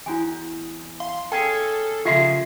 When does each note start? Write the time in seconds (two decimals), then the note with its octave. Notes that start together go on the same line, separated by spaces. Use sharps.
0.06 E2 E4 F#4 G#5
1.00 F5 C6
1.32 C#4 G#4 A4 G5
2.05 C#3 F3 A#3 F4 G4 G#4 E5 C6